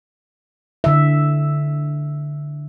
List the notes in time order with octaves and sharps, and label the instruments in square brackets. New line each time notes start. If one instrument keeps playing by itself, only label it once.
[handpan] D3 E5